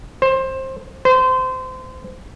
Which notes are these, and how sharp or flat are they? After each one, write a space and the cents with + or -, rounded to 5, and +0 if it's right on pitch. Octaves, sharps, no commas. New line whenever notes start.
C5 +20
C5 -25